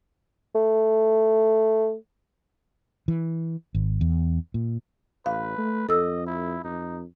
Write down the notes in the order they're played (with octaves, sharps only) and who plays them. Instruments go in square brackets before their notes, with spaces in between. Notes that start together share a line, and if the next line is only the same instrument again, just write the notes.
[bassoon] A3
[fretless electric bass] E3
G#1
E2
A#2
[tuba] A1 [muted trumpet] B4 [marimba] F5
[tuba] A3
[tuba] F2 [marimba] A4 E6 [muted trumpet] D#5
[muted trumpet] E4
[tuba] F2 [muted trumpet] D#4